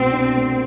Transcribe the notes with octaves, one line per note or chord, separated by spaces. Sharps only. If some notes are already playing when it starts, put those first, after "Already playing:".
Already playing: C2 B2 A3 C4
D4
A3